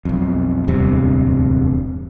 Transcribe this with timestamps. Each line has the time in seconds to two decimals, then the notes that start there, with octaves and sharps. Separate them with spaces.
0.05 B1 F2
0.68 D1 E2 G2 C3